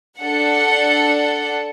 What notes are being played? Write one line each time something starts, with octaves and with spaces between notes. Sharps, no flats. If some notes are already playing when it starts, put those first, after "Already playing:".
D4 A4 F#5